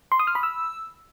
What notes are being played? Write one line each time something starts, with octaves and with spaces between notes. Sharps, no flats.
C6
D#6
F6
B5
E6